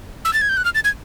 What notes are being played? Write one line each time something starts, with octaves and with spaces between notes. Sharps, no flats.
E6
A6
G#6
G6
F#6
F6
A6
G#6